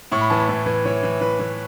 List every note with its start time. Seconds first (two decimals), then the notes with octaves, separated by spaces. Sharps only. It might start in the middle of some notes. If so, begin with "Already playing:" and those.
0.12 A2 C#6
0.21 B5
0.30 E3 A5
0.40 B5
0.49 A2
0.66 E3
0.85 E3 C#5
1.03 E3
1.21 E3 B4
1.39 E3